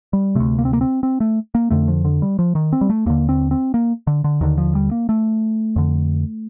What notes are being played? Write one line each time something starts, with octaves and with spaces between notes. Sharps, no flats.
G3
D2 C3 A3
A#3
C4
A#3
C4
C4
A3
A#3
F2 D3 A3
F3
D3
G3
F3
D#3
C4
G3
A3
D#2 D3 A#3
C4
C4
A#3
D3
D3
D#2 D3 D#3
F3
G3
A#3
A3
F2 D3